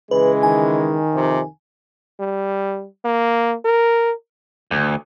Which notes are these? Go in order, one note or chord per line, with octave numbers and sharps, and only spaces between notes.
C#3 E3 G#3 B4
D#3 G#5
F2 C3
G3
A#3
A#4
D2